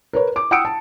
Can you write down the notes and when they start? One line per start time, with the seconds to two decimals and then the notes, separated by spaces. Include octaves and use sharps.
0.13 A#4 B4 C#5
0.36 D6
0.51 F#5 G5 D#6 E6 C#7 D7
0.65 A5